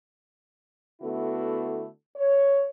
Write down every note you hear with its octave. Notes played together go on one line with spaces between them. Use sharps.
D3 A3 B3 E4 F#4
C#5